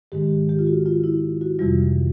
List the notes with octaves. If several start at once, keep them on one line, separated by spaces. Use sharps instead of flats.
G#2 D#3 G#3 G4
G4
F4
F#4
F4
E4
F#4
F2 C3 E3 G3 F4